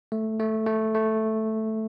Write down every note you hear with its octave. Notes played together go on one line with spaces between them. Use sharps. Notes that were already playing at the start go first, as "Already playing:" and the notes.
A3
A3
A3
A3